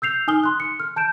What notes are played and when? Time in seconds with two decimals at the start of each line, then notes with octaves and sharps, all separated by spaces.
0.02 E6 G6 C7 F7
0.27 D#4 G#5 D#6 F6 G7
0.44 C6 F#6
0.60 C#7
0.80 F6
0.96 A5 G6 D7 E7